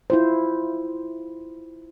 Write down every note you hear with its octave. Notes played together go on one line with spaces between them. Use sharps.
E4 F4 C5